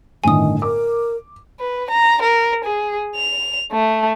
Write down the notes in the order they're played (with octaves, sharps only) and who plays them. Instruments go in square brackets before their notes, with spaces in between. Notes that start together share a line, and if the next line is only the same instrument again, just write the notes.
[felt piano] G1 A2 D3 [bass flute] D#3 [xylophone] G#5 D#6
[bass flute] A#4 [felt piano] D6
[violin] B4
A#5
A#4
G#4
F7
A3